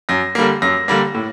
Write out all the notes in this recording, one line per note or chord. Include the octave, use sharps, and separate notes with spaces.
F#2 A#6
D3 G3 A#3
F#2 A#6
D3 G3 A#3
A2